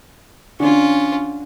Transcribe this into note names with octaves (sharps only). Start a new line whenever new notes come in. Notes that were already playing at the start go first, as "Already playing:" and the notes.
D3 C#4 F4